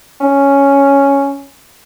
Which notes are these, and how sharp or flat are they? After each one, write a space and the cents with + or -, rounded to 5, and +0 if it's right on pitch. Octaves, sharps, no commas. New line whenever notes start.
C#4 +5